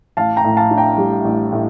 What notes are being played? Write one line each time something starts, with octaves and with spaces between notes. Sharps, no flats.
A1 F5 A5
G5 A#5
A2
F5 A5
D4
G5 A#5
G3
A1
A2